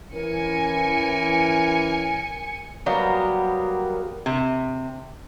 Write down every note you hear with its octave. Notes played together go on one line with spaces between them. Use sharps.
E3 C#4 A#4 G#5 C#7
F#3 G3 A#3 B3
C3